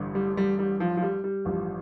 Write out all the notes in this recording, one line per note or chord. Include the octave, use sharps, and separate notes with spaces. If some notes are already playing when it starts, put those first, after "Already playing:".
Already playing: A1 G2 D3
G3
G3
G3
F3
F3
G3
G3
A1 G2 F3